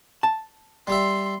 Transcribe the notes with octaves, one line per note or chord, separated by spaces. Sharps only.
A5
G3 G4 E5 C6